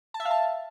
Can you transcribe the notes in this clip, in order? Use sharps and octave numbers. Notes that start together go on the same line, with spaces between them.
A5
E5
F5
A5